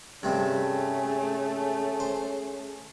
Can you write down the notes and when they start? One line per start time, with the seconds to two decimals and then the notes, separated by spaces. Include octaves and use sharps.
0.23 G2 C3 A3 C#4 G#4
2.00 C5